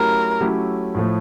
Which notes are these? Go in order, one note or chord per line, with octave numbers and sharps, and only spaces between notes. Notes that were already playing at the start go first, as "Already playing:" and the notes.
Already playing: F#3 A3 C#4 E4 G4 A#4
F#3 A3 C#4 E4 G4
A2 F3 A3